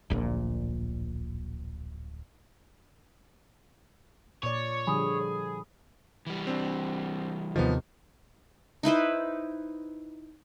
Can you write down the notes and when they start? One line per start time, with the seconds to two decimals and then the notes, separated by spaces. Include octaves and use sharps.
0.10 D1 A#1 A#2
4.43 A#2 C#5 D5
4.87 D3 F3 G3 G#4 B5 D#6
6.27 E3 G3
6.47 C4 D4
7.56 D#2 C3 D#3 F3 B3
8.83 D#4 E4 B4 C5